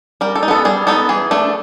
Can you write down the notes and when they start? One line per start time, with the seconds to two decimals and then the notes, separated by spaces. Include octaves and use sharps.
0.21 G3 A#4
0.36 A4
0.43 D#4
0.48 B3 A4
0.65 G3 G#4
0.87 B3 D#4 A4
1.09 E3 G#4
1.31 A3 D4